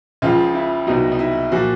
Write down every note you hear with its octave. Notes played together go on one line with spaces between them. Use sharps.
C#2 C#3 F3 F4
E4
C2 B2 F#3 D#4
D#4
E4
A#2 F3 F#4